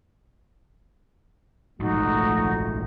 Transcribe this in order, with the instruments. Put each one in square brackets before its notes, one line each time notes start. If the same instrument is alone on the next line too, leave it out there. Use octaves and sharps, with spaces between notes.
[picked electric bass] A#1 G#2 [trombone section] D#3 F3 A3 [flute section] D#4 F#4